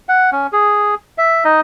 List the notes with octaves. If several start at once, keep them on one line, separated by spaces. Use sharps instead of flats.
F#5
C#4
G#4
E5
D#4 D#5